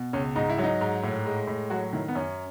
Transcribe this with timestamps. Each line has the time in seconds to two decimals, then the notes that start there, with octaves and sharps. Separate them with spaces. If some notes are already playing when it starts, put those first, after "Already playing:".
Already playing: B2
0.13 C#2 C#4
0.36 G#2 D#4
0.49 E4
0.58 F#3
0.63 D#4
0.81 G#2
1.03 A2
1.26 G#3
1.47 A2
1.70 F#3 F#4
1.93 D#3 E4
2.08 B3
2.15 F#2 C#4